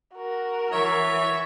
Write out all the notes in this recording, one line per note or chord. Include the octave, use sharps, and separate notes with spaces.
F#4 A#4
E3 C#5 E5 C#6